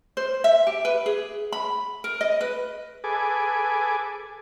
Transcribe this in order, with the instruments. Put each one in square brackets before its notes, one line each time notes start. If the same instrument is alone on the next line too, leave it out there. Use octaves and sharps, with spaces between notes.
[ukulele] C5
E5
G4
B4
G#4
B5
A#4
D#5
B4
[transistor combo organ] G#4 A4 B4 G#5 D6